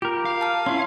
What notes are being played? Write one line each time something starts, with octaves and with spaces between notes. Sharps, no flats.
F4 G4 A#4
F5
A5 F6
C#4 E4 C6